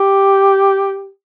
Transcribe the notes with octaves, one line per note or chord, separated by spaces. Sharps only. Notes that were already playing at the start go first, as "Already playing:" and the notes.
Already playing: G4